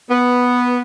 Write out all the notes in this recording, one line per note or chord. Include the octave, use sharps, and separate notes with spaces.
B3